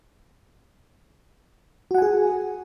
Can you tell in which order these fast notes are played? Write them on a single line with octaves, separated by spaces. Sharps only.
F#4 F#5 G#5 G#4